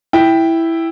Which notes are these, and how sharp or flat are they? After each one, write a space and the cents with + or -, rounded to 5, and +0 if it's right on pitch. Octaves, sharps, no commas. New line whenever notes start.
E4 +0 G5 +0